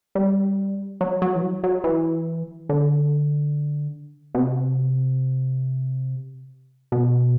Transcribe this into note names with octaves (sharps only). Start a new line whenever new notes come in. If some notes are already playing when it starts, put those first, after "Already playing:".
G3
F#3
F#3
E3
F#3
F#3
E3
D3
B2
C3
B2